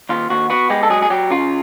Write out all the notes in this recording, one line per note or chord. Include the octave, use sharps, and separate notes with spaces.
D#2 F4
D#2 F#4
B3 F#4
G#3 G4
A4
F#3 G#4
G#4
F#3 G4
C#3 F4